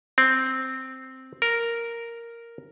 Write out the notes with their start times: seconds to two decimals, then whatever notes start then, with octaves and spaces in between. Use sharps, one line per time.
0.18 C4
1.42 A#4